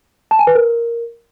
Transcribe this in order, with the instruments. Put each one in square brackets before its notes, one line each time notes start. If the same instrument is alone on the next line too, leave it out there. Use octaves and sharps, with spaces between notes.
[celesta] A5
G#5
B4
A#4